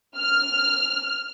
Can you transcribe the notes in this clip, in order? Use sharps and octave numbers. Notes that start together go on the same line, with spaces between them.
F6